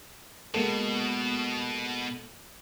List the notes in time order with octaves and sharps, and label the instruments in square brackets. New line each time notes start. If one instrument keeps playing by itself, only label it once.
[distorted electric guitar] B2 [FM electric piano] G#3 A#3 A4